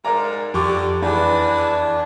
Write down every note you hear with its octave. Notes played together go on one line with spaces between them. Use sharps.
G#2 A#4 D5 A#5
F2 D3 G4 C#6 D6
E2 E3 D4 G#4